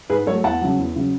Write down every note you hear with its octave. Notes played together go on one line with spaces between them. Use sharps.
G#2 G#4 B4
F#3 A3 A4 C#5
E2 F#5 A5
C#3 F#3
E2
C#3 F#3